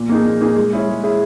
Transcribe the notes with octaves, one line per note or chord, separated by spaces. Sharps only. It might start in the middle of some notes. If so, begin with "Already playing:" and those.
Already playing: A#2
A#3 D#4 G#4
A#2
A#3 D#4 G#4
G#3
C#4 E4 G#4
G#3
C#4 E4 G#4